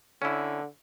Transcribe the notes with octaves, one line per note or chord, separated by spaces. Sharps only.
D3 C#4 E4